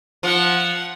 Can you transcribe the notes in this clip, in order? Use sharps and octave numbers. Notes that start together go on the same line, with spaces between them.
F3 F#5